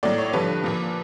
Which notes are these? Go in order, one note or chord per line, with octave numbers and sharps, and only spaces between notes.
A2 F#3 D5
C#5
G2 D3 F3 B4
A#2 F3